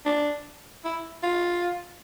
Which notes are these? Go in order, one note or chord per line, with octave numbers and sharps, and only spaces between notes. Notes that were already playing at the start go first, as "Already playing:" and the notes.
D4
E4
F4